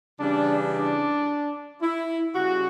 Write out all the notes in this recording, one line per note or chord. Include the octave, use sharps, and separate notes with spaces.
C#3 E3 G3 D4
D4
E4
C#3 G3 F#4